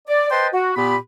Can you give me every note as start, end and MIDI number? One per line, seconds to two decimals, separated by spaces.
0.08 0.28 74
0.31 0.48 71
0.31 0.48 72
0.31 0.48 75
0.31 0.48 79
0.31 0.48 81
0.31 0.48 84
0.53 0.73 66
0.76 0.96 46
0.76 0.96 59
0.76 0.96 67
0.76 0.96 83